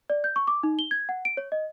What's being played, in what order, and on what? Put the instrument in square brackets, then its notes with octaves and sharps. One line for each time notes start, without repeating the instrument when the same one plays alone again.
[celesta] D5
G6
C#6
D6
D#4
G7
G#6
F#5
D7
C#5
D#5